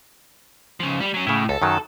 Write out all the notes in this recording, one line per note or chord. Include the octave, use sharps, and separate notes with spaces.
C#3 F3
G3
F#3 C#4
A2 C#3 E4
C#2 A4
F#2 D#3 F#3